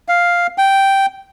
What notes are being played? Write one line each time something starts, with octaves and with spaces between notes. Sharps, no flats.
F5
G5